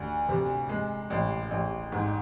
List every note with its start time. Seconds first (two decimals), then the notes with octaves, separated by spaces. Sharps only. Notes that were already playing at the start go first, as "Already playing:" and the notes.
Already playing: D2
0.29 C3
0.69 G#3
1.10 A1
1.51 A1
1.92 G#2